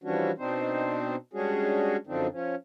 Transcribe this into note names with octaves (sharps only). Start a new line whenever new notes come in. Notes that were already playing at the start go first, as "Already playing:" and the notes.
E3 F3 G3 C#4 D4 F#4
B2 C4 D4 D#4 C5
G3 G#3 C#4 D4 F#4 G#4
F#2 D3 F3 C4 D4 D#4
F3 C#4